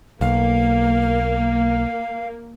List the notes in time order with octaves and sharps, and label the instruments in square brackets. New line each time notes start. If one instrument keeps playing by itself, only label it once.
[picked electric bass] B1 [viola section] A#3 [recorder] F5